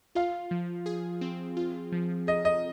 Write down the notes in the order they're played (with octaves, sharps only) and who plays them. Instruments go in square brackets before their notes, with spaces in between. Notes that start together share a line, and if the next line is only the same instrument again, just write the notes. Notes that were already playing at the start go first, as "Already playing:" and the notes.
[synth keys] F4 [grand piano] F5
[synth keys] F3
G#4
C4
F4
F3
[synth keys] G#4 [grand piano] D#5
[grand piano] D#5